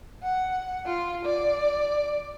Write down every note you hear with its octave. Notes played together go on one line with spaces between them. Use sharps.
F#5
F4
D5